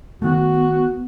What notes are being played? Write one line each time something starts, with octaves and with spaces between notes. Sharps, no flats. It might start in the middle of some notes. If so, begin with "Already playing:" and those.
D#3 A3 B3 F#4